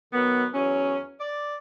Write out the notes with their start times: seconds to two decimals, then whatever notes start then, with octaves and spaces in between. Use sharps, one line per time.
0.13 D#3 F#3 B3
0.53 E2 F#3 C#4
1.19 D5